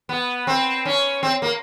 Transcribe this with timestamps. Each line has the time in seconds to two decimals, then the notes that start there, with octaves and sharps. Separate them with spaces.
0.09 B3
0.47 C4
0.86 C#4
1.23 C4
1.42 A#3